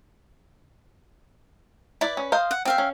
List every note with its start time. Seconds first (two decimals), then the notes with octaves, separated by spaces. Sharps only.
2.01 E4 B4 D5
2.17 C#4
2.32 C5 D#5 F5
2.51 F#5
2.65 C4 E5 F5 G5
2.78 C#4